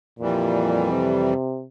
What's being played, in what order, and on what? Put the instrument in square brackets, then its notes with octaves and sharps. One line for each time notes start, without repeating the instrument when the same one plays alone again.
[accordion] F2 E3 G3 [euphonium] A#2
[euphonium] C3